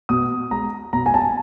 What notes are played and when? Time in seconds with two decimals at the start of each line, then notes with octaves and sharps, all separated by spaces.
0.09 B2 D#6
0.51 G#3 A#5
0.93 B2 A#5
1.06 G#5
1.14 A5